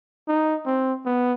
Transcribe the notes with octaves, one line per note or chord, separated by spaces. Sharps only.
D#4
C4
B3